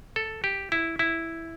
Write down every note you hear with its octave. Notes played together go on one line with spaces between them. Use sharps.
A4
G4
E4
E4